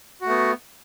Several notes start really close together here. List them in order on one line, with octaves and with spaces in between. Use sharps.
F#4 A3 B3